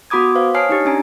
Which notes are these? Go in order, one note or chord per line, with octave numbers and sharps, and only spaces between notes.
B3 F#4 B5 D6 D#6 G#6
B4 C5 F5
C#5 G#5 A5 D#6 F6 C7
D4 D#4 G4
C#4 D4 G#5 A#5